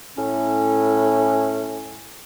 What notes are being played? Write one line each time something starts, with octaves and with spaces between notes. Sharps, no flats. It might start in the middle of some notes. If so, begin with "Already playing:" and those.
A2 C#4